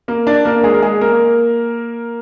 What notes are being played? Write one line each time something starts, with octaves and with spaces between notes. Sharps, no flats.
A#3 A#4
D4 D5
A#3 A#4
G#3 G#4
A#4
G#3 G#4
A#3 A#4